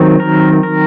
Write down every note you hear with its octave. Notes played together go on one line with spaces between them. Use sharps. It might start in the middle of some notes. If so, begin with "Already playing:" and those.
Already playing: D#3 F#3 C4
A#4
A#4